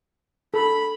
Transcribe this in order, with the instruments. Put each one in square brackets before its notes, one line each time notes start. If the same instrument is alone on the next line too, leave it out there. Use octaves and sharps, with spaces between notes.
[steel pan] A4 [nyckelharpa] B5